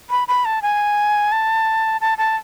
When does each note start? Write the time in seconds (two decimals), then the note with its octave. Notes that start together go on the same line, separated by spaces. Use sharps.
0.10 B5
0.28 B5
0.45 A5
0.62 G#5
1.32 A5
2.01 A5
2.18 A5